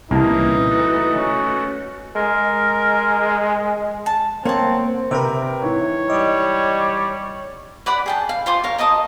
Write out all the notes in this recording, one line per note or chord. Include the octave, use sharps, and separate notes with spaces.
C2 A#2 C#3 E3 A#3 D#4 A5
A3 F#4
C#4
G#3 A#4
A5
A#3 C4 C#5 F#5 A5
C3 C4 A#4 B4 E5
G#2 E3 C#5
G3 D#5
B4 D5 F#5 B5
G#4 G5 A5
F5
F4 C5 C6 D6
A#4 C#5 F5
A#4 D#5 A5 D#6